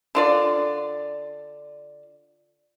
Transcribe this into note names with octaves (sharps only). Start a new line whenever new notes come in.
D3 F4 D5